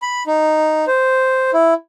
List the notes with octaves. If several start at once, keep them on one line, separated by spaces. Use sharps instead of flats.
B5
D#4
C5
E4